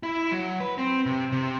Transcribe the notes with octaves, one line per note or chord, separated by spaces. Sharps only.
E4
F#3
B4
C4
C3
C3